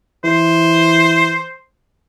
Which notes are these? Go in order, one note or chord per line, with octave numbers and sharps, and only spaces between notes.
E3 C5